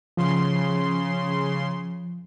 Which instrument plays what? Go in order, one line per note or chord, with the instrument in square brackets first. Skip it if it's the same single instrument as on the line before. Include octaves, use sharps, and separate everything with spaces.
[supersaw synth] C#3 C6 [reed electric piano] F3